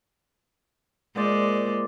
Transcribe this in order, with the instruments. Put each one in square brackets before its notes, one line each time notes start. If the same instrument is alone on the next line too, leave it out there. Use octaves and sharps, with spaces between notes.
[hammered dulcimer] A#2 C5 D5 [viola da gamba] G#3